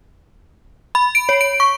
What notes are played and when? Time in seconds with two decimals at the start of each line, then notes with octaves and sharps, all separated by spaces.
0.95 B5
1.15 D7
1.29 C#5
1.41 D7
1.60 C#6